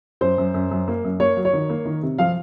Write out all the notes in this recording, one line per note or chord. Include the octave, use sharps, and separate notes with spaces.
F#2 C5
F#2
F#2
F#2
A#3
F#2
A#3 C#5
F#3
C#5
D#3
A#3
D#3
C3
F3 F5